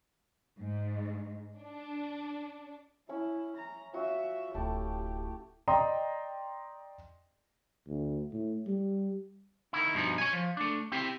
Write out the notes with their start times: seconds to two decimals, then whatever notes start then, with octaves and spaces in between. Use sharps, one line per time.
0.59 G#2
1.59 D4
3.09 C#4 E4 E5
3.56 A#5
3.94 C#4 F4 F#4 E5
4.55 D1 A3 E4 G4 A5
5.68 D5 D#5 G5 A#5 C6 D#6
7.88 D2
8.33 A2
8.67 G3
9.73 D#3 E4
9.94 G2 B2 E3 F3 D#4
10.18 C#5 G#5
10.33 F3
10.57 A3 D4
10.92 C4 E4 G4